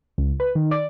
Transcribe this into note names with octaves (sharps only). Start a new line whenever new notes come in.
C#2
B4
D#3
D5